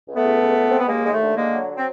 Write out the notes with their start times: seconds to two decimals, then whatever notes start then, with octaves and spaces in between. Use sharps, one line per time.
0.08 C#2
0.15 A3 B3
0.24 C#2
0.41 C#2
0.57 C#2
0.69 C#2 C4
0.79 B3
0.88 D#2 G#3 A#3
1.05 D#2 G#3
1.13 A3
1.22 D3
1.37 D3 G#3 A#3
1.54 F#3
1.69 F#3
1.77 C4